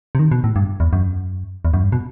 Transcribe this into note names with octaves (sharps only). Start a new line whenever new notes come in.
C3
D#3
B2
A2
G2
E2
F#2
E2
F#2
G2
B2